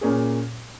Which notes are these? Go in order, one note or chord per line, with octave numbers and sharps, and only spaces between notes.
A#2 A#3 C#4 G#4